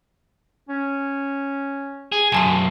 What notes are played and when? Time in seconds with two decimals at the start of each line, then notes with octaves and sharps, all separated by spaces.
0.69 C#4
2.12 G#4
2.32 B1 F#2 G#5 A5 F7